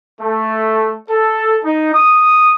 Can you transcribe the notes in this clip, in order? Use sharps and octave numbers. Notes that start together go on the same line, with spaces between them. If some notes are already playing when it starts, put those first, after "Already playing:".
A3
A4
D#4
D#6